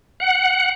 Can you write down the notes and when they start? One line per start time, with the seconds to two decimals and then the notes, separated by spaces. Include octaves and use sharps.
0.20 F#5